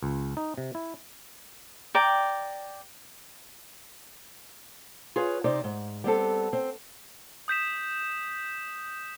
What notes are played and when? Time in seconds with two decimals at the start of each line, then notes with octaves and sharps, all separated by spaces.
0.03 C#2
0.37 D#4
0.57 C3
0.75 E4
1.95 D5 G5 A#5
5.16 F4 G#4 B4 C#5
5.44 C3 D#4 C5 D5
5.64 G#2
6.04 G3 B3 C4 A4
6.53 C4
7.48 D#6 G6 B6 E7